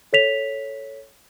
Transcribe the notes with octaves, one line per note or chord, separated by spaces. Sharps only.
A4 C#5 B6 F7